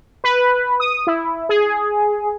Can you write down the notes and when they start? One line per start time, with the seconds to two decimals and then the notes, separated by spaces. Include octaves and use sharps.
0.24 B4
0.80 D#6
1.07 E4
1.49 G#4